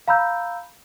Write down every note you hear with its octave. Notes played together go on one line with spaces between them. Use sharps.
F5 A#5 B5 E6 G6